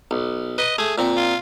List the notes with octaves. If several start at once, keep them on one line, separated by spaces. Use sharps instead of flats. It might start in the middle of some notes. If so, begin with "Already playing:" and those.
B1
B4 D#5
A3 G#4
A#2 F3 C4
F4